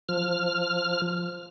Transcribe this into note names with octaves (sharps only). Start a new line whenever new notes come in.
F3 F6